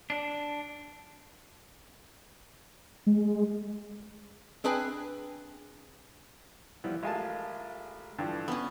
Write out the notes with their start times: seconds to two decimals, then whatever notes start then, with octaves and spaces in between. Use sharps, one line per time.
0.10 D4
3.07 G#3
4.64 C4 D4 G#4 B4 G5 G#5
6.84 E3 F3 G3 B3
7.03 A1 G#3 F4 A#4 G#5 A5
8.19 G2 D3 E3 F3
8.48 B3 C#4